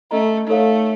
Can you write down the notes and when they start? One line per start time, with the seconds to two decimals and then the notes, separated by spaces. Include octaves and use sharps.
0.11 A3 C#4 A4 D#5 A#5
0.48 A3 D#4 A4 C#5 F5